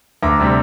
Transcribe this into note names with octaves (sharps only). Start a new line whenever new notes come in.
D2 A#5 D6
C3 G3